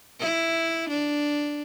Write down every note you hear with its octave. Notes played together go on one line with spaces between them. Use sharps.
E4
D4